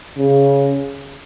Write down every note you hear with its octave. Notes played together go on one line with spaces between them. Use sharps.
C#3